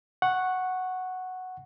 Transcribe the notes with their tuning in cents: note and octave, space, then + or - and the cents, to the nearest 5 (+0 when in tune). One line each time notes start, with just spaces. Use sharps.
F#5 +0 C#6 -10